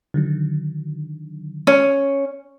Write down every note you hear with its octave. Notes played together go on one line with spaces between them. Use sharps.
D3 D#3 F#3
C#4